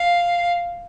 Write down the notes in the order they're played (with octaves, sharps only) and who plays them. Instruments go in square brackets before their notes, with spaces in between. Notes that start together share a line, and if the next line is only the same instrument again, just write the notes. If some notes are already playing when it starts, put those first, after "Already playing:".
Already playing: [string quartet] F5